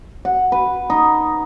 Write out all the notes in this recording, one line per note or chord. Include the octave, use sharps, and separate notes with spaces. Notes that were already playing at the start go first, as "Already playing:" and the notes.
F#5
B4
D#4